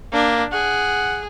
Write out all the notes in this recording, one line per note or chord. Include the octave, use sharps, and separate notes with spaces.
A#3 D4
G#4 F#5